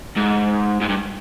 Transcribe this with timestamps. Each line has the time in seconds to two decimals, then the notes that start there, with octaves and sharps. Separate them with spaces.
0.16 G#2
0.81 G#2
0.89 G2